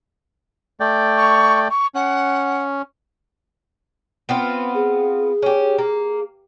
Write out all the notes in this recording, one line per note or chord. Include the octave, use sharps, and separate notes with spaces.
A3 D5 G5
C#6
C#6
C#4 F#5
B3 C4 F4
G#4
C#4 G4
A#3